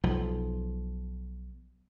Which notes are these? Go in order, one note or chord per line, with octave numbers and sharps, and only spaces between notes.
B1 F3